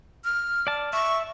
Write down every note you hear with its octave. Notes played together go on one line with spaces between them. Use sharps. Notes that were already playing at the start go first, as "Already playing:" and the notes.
F6
D5 A5
E5 C#6